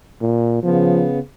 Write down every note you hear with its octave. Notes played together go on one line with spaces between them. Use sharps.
A#2
C#3 F3 B3